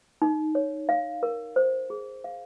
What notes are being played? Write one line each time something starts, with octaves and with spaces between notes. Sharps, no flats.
D#4
C#5
F5
A#4
C5
G#4
F5